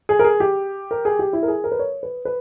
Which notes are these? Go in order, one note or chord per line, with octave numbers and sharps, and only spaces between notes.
G#4
A#4
G#4
G4
A#4
G#4
G4
E4
A#4
G#4
A#4
B4
C#5
B4
B4